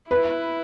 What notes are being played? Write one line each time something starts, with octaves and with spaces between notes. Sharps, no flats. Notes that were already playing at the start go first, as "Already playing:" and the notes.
E4 B4